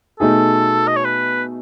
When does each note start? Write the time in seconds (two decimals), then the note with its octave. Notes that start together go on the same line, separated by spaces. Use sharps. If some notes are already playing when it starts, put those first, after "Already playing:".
0.20 B2 A3 D#4 G#4 A4
0.88 D#5
0.96 C#5
1.05 B4